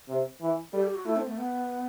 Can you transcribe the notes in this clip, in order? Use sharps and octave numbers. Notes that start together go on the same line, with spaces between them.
C3
E3
G3 A4
G4
F#4
A3 E4
C4
A3
B3